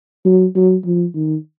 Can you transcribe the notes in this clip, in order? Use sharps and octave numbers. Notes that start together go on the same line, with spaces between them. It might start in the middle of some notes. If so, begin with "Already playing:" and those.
F#3
F#3
F3
D#3